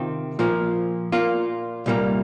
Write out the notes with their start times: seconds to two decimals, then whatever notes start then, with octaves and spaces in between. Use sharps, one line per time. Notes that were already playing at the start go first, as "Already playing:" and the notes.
Already playing: C3 D#3 C4 F4
0.39 A#2 F3 A#3
1.12 A#2 A#3 F4
1.86 C2 A#2 G3 A#3